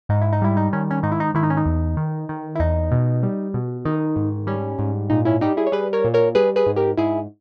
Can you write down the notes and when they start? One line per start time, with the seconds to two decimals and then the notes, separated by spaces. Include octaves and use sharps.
0.09 G#2 D#4
0.22 E4
0.33 D#4
0.42 G3 E4
0.57 D#4
0.73 D#3 C#4
0.91 C#4
1.03 G#2 D#4
1.12 E4
1.20 D#4
1.34 D#3 E4
1.43 D#4
1.50 C#4
1.57 D#4
1.66 E2
1.97 D#3
2.29 D#3
2.55 E4
2.59 E2 D#4
2.92 B2
3.23 G3
3.54 B2
3.85 D#3 D#4
4.16 G#2
4.47 G3 C#4
4.79 G#2
5.10 A#2 D#4
5.25 C#4 E4
5.41 G3 D#4 G4
5.57 E4 G#4
5.67 C#5
5.72 G3 G#4 B4
5.93 A#4 C#5
6.04 A#2
6.14 A#4 C#5
6.35 G3 G#4 B4
6.56 G#4 B4
6.66 G#2
6.76 G4 A#4
6.97 G#2 E4 G#4